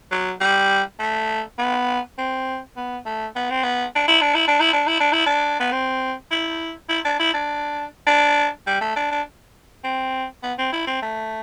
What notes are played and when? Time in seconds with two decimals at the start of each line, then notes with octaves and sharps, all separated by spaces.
0.11 F#3
0.41 G3
1.00 A3
1.59 B3
2.18 C4
2.76 B3
3.06 A3
3.36 B3
3.50 C4
3.63 B3
3.95 D4
4.08 E4
4.21 D4
4.35 E4
4.48 D4
4.60 E4
4.73 D4
4.87 E4
5.00 D4
5.12 E4
5.26 D4
5.60 B3
5.72 C4
6.31 E4
6.89 E4
7.05 D4
7.19 E4
7.34 D4
8.07 D4
8.67 G3
8.81 A3
8.96 D4
9.11 D4
9.84 C4
10.43 B3
10.58 C4
10.73 E4
10.87 C4
11.02 A3